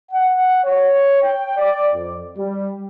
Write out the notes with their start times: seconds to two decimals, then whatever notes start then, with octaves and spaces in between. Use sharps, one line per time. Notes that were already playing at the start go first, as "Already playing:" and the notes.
0.12 F#5
0.64 C#5
1.22 G5
1.57 D5
1.94 F2
2.37 G3